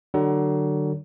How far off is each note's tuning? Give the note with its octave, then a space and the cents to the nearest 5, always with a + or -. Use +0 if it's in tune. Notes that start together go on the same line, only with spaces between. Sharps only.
D3 +35 F#3 +35